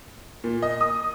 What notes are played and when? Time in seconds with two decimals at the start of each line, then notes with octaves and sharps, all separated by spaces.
0.44 A#2
0.62 D#5
0.81 D#6